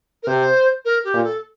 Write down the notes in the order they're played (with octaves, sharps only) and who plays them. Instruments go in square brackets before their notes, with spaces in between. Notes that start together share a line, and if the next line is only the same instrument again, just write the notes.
[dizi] A#4
[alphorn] C3 [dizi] C5
[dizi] A#4
G4
[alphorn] A#2
[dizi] A4